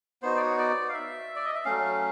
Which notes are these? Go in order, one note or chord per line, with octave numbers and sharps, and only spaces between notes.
B3 D#4 F#4 C5
D5
C#5
D5
F5
E5
D5
D#5
E5
F#3 A3 C#4 F5